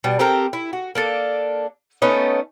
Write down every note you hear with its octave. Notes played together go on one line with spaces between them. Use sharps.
B2 G3
C4 G4 A4 A#4
E4
F#4
A#3 D4 A4
A3 B3 C#4 D#4